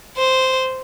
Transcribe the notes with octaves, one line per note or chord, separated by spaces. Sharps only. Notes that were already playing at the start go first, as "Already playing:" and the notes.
C5